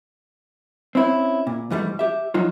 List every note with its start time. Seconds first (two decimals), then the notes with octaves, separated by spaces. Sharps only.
0.95 C4 C#4 E4
1.47 A#2
1.70 G#2 E3 G3 A3
1.99 G4 E5
2.34 F3 F#3 D#4 F4